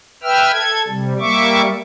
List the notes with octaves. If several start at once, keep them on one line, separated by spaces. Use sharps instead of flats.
B4 E5 G5 E6 F6
A4 G#6
C3 G3
G3 A#3 E5 C#6 D6